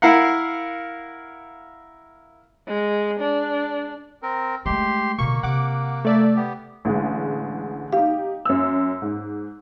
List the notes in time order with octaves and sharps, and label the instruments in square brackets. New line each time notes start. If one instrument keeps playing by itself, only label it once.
[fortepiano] E4 A#4 F5 F#5
[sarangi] G#3
D4
[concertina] C4 A#4
[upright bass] G#3 A3 [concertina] G4 C6
[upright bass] B2 D3 [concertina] A#3 [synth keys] C#6
[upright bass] C3 [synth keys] F#5 D6
[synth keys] A3 D5 E5
[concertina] B3 G4
[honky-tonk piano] A1 D3 G#3
[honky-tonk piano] D#4 G4 [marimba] F5
[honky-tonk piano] F#2 E6
G#2